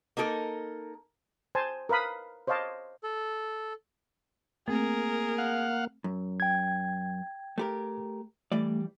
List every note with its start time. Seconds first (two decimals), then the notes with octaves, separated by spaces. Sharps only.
0.17 A#3 D#4 A4 A#4
1.55 C5 G#5 A5 C6
1.89 A#4 B4 F5 B5 D#6
2.47 C5 C#5 D#5 F5 A5 D6
3.03 A4
4.68 A3 A#3 C4 G#4 A#4
5.38 F5 F#5
6.04 F#2
6.40 G5 G#6
7.58 A3 G4 A#4
8.52 E3 G3 A3 D5